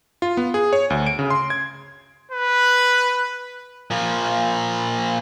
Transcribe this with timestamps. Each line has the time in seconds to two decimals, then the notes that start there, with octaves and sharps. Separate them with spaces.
0.22 F4
0.37 B3
0.54 G#4
0.73 C#5
0.90 D2
1.07 D7
1.19 C#3
1.30 C6
1.50 G#6
2.32 B4
3.91 A#2 F3